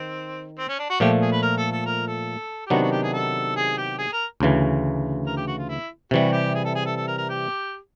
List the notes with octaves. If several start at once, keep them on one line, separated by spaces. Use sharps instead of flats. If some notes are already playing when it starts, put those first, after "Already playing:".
Already playing: D#3 C4
C4
C#4
D4
F#4
A#2 F3 A3 G4
G#4
B4
A#4
A4
A4
A#4
A4
G4
C3 D#3 F#3 B3 D4 F#4
F#4
G4
G#4
A4
G#4
G4
G#4
A#4
D2 C#3 E3
A#4
G4
F#4
F4
E4
C3 E3 G3 F#4
G4
G#4
A4
G#4
A4
A4
A#4
A#4
G4